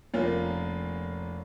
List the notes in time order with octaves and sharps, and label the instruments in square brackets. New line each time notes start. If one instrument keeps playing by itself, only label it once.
[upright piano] F1 A#3 C#4 F4